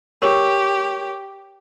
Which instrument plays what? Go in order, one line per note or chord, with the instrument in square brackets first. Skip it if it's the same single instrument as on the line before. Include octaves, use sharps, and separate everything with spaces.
[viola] G4 [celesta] A#4 C#5 C#6